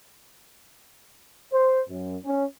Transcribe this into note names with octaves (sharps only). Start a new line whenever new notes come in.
C5
F#2
C#4